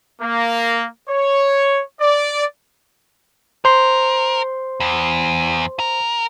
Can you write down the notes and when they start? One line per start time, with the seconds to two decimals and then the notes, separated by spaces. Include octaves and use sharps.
0.22 A#3
1.09 C#5
2.01 D5
3.65 A#4 C5 C6
4.80 E2
5.79 A#4